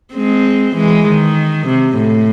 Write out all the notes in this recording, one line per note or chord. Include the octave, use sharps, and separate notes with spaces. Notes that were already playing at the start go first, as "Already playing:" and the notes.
G#3 C4
E3 G#3
D#3
C3
A2